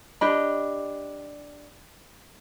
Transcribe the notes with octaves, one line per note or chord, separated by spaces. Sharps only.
D4 G4 D#5 B5